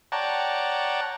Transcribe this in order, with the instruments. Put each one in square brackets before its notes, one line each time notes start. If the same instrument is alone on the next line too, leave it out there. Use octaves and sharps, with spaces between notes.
[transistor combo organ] C#5 D5 F#5 G5 A5 A#5